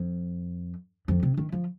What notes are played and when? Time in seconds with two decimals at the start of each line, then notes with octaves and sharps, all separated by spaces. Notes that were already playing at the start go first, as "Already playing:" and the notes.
Already playing: F2
1.08 F2
1.23 C3
1.37 D#3
1.52 F3